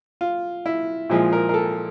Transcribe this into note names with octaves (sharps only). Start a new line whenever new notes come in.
F4
E4
A#2 F3 G#3 E4
A#4
A#4
A4